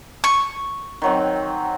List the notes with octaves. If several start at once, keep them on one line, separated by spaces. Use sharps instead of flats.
C#6
D#3 F#3 C4